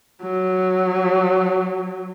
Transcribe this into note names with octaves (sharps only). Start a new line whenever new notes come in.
F#3